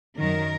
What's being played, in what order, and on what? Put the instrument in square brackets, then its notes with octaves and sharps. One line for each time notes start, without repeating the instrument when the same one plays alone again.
[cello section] F#2 D#3 F#3 A#4